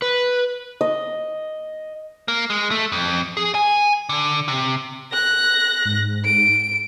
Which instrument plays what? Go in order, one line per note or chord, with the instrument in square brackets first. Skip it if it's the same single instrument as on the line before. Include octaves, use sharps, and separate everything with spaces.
[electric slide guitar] B4
[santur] D#5
[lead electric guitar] A#3
G#3
A3
F2
G#4
G#5
D3
C3
[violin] F#6 A#6
[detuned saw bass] G#2
[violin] D7